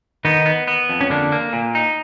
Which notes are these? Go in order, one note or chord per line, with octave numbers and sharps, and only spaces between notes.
D#3 B3 D#4
B3
B3
F2
C#4
D3 A#3 D4
A#3
A#2
D#4